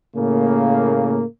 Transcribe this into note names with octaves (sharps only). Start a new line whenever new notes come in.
A2 C#3 A#3